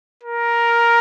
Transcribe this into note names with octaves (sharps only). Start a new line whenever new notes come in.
A#4